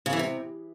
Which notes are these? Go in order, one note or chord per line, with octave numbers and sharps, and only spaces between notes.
C#3
E3
C3